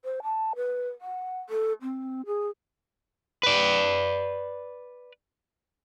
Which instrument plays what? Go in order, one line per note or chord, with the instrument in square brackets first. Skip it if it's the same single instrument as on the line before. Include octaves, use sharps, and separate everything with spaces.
[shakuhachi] C5
A5
B4
F#5
A4
C4
G#4
[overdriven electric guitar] B4 D5